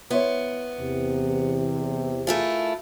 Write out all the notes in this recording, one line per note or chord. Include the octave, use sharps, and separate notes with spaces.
B3 E4 C5 C#5
E2 C3
A3 E4 F4 G#4 A#4